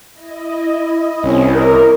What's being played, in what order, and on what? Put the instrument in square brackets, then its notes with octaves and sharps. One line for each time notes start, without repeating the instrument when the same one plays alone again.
[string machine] E4 D#5
[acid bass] C2 [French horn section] C4 C#4
[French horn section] A#4